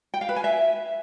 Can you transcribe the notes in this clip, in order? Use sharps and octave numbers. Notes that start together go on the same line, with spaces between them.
G5
F5
B4
G#5
E5